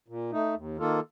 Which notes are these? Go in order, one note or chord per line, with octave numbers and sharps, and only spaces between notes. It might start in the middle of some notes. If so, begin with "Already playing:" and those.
A#2
A3 D#4
D#2
D#3 A#3 F4 A4